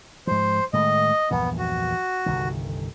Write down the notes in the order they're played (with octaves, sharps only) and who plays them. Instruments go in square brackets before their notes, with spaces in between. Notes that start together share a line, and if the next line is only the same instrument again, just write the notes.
[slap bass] G#2 F3 [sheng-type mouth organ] C5
[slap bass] A2 D#3 G#3 [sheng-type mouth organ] D#5
[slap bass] A#1 E2 G2 [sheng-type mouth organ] B3
[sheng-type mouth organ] F#4
[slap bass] G1 C2 D#3